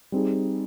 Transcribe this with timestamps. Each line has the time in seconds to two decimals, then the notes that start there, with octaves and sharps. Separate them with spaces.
0.12 G3 C4 D#4 G#4